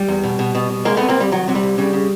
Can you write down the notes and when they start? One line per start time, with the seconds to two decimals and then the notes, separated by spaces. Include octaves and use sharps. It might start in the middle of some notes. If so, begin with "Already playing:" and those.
Already playing: G3
0.08 E2
0.24 B2
0.39 B2
0.55 B2
0.70 B2
0.85 C2 G#3 A#3
0.97 C3 A3 B3
1.08 A#3 C4
1.16 C2 G3
1.31 D#3 F#3
1.47 C3 F#3
1.55 G3
1.63 C2
1.78 C#3 G3
1.93 C#3